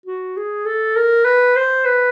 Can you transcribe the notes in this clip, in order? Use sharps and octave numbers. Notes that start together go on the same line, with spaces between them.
F#4
G#4
A4
A#4
B4
C5
B4